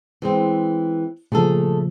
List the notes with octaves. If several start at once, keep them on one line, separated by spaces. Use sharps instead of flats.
E3 G#3 C4
A#2 C#3 F3 A3 G#4 A4